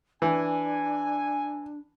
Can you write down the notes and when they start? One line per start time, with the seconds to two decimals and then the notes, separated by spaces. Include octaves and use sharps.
0.22 E3 D4 G#5